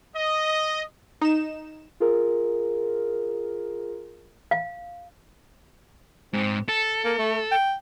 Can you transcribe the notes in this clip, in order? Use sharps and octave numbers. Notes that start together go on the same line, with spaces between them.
D#5
D#4 E7
F4 G#4 A#4
F5
G#2 C4
A4 A5
A#3
A3
G5